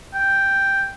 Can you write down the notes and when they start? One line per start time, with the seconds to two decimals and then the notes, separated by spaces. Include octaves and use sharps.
0.14 G5